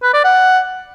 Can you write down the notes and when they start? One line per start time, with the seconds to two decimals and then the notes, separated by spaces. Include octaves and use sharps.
0.03 B4
0.14 D5
0.24 F#5